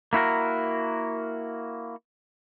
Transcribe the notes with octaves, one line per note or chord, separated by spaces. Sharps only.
A#3 E4 F#4 A#4